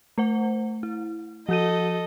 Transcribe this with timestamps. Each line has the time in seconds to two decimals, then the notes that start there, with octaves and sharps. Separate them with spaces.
0.18 A3 C5 F#5
0.83 E4
1.49 F3 F#4 A4 D#5 D#7